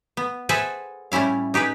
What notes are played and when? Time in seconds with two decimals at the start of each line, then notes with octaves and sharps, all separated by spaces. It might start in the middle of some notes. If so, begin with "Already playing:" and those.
0.17 B3
0.49 G#4 A4 B4 C5 E5 F#5
1.12 A2 G3 C#4 E4 F5
1.54 D#4 G4 G#4 B4